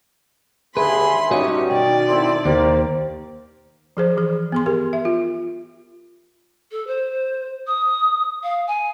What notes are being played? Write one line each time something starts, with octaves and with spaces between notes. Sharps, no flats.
D#2 D3 G#4 B4 E5 G#5 B5 C6
G2 C#4 D#4 F#4 G4 C#5 D#5
B2 D#3 D5 G5
C4 E4 A4 C6
D#2 A#3 G4 C5
F3 G#4 C5
E3 G#4
B3 G#4 C6
G4 A#4
E5
F4
A4
C5
D#6
F5
G#5